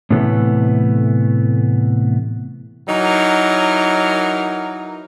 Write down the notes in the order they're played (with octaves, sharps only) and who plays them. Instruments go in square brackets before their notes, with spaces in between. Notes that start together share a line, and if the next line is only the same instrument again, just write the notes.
[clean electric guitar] A2 C3 E3 A3 B3
[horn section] E3 F#3 D#4 A#4